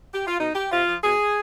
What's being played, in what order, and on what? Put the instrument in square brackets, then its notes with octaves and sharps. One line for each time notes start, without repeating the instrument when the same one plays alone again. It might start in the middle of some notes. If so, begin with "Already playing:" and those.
[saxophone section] G4
F4
B2 D#4
G4
C3 F4
F3
B2 G#4